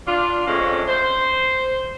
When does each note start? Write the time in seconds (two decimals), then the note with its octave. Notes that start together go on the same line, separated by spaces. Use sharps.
0.07 D4 F4
0.47 F2 D3 G#3 A3 C#4
0.88 C5